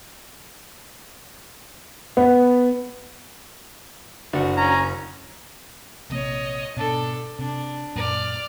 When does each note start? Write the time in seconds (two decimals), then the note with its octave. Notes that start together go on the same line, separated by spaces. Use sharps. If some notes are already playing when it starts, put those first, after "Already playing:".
2.17 B3
4.33 F#1 D4 F#4
4.58 C#4 A#5
6.10 A#1 C3 A#3 C#5 D#5
6.77 G#2 B2 D4 A4
7.39 C3 D4
7.96 F#2 A#2 D5 F6